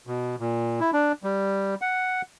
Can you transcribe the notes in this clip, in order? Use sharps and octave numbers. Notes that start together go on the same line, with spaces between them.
B2
A#2
E4
D4
G3
F#5